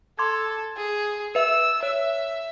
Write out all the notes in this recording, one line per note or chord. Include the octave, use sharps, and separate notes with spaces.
A4 C6 D6 G#6
G#4
B4 E5 E6
C#5 E5